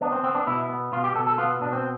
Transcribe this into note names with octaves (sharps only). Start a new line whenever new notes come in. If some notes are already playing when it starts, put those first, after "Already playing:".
B3 D4
C4
B3 C4
D4
B2 E4
B3
B2 F4
G4
B2 A4
A4
B3 F4
B2 D4
C4